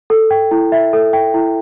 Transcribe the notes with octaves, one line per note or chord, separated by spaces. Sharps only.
A4
G5
E4
E5
A4
G5
E4